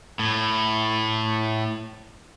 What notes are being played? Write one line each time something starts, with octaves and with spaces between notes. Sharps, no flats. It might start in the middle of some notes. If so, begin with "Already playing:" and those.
A2